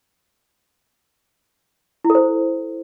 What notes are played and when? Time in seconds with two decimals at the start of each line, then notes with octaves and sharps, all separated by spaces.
2.05 E4
2.10 A4
2.15 C5